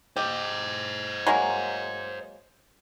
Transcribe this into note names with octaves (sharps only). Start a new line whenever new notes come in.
G4 C5 D#5
F#3 G#3 A#3